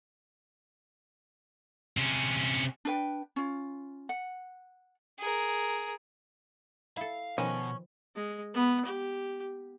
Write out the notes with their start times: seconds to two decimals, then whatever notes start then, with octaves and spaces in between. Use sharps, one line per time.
1.97 C3 C#4
2.85 D4 B4 G5
3.36 C#4 F4
4.09 F#5
5.19 G#4 A#4
6.97 E4 A4 F5
7.38 B2 D#3 F3 B3 C#4
8.15 G#3
8.54 B3
8.85 G4